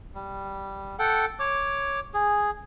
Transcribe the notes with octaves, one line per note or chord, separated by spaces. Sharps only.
G3
A4 F#5 G5
C#5 D6
G#4